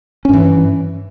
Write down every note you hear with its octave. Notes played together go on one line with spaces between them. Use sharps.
G2 E3 C#4